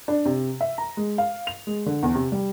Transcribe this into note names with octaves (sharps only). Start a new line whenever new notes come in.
D4
C3
E5
A#5
G#3
F5
F7
G#3
D3
E2
C3
G3